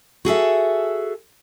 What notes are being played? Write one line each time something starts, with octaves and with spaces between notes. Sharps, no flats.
F#4 G#4 A4 E5